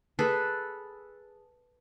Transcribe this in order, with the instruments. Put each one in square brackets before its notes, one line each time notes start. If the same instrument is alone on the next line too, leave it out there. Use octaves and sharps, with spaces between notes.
[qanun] G#4 A4 B4